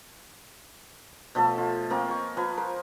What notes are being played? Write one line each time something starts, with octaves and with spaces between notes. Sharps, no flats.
B2 F3 A3 A4
F4
A#3 C4 A#4 D#5
G#5 C#6
F3 B4 G#5
A#4 C5